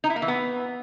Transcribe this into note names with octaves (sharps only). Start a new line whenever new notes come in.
D#4
E4
A#3
E3
B3